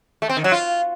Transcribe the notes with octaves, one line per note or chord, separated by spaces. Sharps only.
A3
C4
D#3
F#3
F4